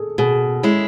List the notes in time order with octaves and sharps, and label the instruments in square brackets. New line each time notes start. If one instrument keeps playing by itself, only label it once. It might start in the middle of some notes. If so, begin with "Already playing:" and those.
Already playing: [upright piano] G#4 A4
[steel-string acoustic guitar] B2 [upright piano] G#4
[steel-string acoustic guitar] G#3 C#4 E4